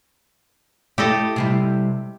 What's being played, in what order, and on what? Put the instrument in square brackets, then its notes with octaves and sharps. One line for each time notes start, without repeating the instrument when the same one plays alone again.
[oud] A3 E4 [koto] G4 A4 D#5
[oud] C3 G3 E4